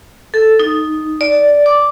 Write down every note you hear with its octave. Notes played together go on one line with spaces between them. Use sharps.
A4
D#4
D5
D6